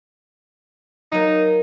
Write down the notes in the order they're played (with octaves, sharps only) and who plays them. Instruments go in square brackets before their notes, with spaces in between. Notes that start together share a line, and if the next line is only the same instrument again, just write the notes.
[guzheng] F#3 A#3 [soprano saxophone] D#4